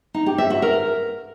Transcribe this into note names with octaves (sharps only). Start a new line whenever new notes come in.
D#4
G4
E5
F#4
A#4